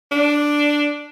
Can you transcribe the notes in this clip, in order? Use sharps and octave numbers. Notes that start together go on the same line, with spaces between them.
D4